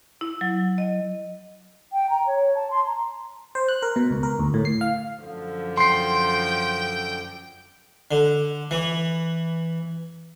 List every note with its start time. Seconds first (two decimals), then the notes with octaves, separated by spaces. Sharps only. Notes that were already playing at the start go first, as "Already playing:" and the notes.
0.21 E4
0.41 F#3
0.78 D#5
1.93 G5
2.10 A#5
2.27 C#5
2.55 A5
2.71 C6
2.87 A#5
3.55 C5
3.68 F#6
3.82 A#4
3.96 B2
4.11 C#2
4.23 A#4
4.39 D2
4.54 A2
4.65 C7
4.81 F5
5.23 F#2 D3 F3
5.77 G5 C6 C7
8.11 D3
8.71 E3